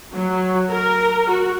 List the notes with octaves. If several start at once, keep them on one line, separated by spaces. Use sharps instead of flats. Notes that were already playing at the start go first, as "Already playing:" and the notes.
F#3
A#4
F#4